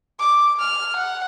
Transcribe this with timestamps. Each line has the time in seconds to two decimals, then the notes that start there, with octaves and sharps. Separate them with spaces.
0.19 D6
0.59 F6
0.97 F#5